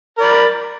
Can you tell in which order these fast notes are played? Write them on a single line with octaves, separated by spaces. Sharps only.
A#4 D5 B5